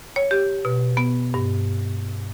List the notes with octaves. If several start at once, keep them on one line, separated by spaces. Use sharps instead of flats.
C#5
G4
B2
B3
G2